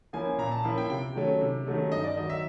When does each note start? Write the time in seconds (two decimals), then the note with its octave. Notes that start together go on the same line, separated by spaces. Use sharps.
0.13 F3 A#3 C#4 E4 G#5
0.38 A#2 A#5
0.52 A5
0.64 F3 A#3 C#4 E4
0.78 G5
0.90 C3 G5
1.15 D#3 F#3 A3 C#4
1.41 C3
1.66 D#3 F#3 A3 C#4
1.92 G2 D#5
2.04 D5
2.16 D#3 F#3 D#5
2.30 E5